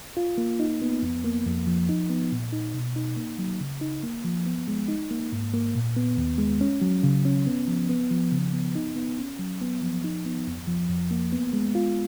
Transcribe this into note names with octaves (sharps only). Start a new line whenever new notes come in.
F4
A#3
D#4
B3
F2
A#3
F2
F3
D#4
B3
A#2
D#4
B2
D#4
A#3
F#3
C#3
D#4
A#3
F3
B3
G#3
D#4
A#3
G#2
A#3
A#2
B3
D#2
G#3
C#4
F#3
C#3
C#4
B3
F3
B3
F3
C#3
B3
D#4
B3
C#4
F#3
B3
F3
D#4
B3
F2
F3
F2
A#3
B3
G#3
F4